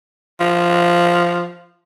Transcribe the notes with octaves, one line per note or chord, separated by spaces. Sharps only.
F3